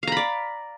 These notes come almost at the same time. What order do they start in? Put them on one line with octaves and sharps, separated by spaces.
F5 A#5 B5 D5